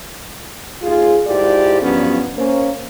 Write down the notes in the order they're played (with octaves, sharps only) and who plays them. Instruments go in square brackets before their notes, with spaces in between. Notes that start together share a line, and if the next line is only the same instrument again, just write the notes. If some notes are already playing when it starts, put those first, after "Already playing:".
[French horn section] D#2 F4 G#4
G#2 E4 F4 G4 A4 D5
G2 F3 F#3 B3 C#4
A#3 C#4 C5